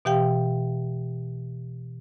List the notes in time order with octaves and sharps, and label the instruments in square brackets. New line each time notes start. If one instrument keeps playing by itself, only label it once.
[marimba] B2 E3 G4 F5 G5